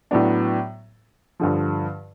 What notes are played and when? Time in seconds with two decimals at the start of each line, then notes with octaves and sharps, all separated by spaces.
0.11 A2 F#3 B3 D4
1.40 G2 D3 F3